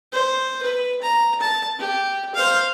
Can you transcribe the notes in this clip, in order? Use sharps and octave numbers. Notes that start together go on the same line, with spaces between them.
C5
B4
A#5
A5
G4
C5 F5